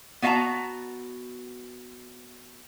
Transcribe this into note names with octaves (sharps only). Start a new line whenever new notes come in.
B3 F#4 E5 F5 A5 A#5